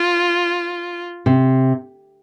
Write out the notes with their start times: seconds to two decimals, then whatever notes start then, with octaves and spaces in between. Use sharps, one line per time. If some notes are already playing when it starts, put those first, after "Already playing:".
Already playing: F4
1.26 C3